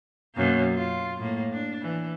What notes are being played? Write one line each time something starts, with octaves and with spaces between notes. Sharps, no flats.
F#2 B2 A#3
F4
A2 A#3
D4
E3